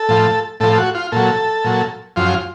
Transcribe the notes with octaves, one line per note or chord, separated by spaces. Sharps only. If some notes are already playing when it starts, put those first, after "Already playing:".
Already playing: A4
A2 F3
A2 F3 A4
A4
F#4
F4
A#2 F#3 A4
A#2 F#3
F#2 F3 F4